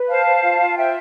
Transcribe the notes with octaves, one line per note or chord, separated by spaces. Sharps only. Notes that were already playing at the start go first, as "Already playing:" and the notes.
Already playing: B4
C5 F5 A5
C5
F4
F4
C5 E5 G5